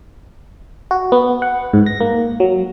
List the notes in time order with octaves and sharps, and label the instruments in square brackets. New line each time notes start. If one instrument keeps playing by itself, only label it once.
[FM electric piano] F#4
B3
F#5
G#2
A#6
A#3
F#3